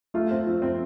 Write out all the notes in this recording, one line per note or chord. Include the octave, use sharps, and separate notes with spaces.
A3 F4
C4
F3
C4